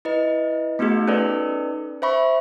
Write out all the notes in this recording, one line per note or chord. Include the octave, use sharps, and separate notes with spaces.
E4 B4 D#5
A3 B3 D#4 F#4 G#4
C#4 D#4 A4 B4 D5
C5 E5 B5 C#6